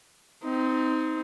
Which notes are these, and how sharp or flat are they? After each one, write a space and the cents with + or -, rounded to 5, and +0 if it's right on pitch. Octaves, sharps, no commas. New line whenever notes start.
C4 -15 D#4 +20